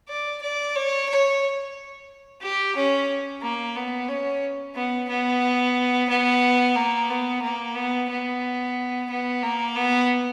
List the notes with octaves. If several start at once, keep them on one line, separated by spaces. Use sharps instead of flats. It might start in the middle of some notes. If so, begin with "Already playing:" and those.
D5
D5
C#5
C#5
G4
C#4
A#3
B3
C#4
B3
B3
B3
A#3
B3
A#3
B3
B3
B3
A#3
B3